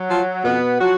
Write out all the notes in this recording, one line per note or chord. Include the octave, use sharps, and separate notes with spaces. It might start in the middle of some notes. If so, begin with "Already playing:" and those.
Already playing: F#3
F3
F2 B2 B3
F3 F#3 F#4